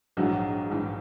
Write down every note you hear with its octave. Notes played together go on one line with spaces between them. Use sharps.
A#1 G#2 E3 F#3 F#4
A#1 G#2 E3